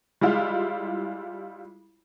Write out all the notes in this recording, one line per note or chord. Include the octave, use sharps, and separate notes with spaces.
G3 G#3 E4 F4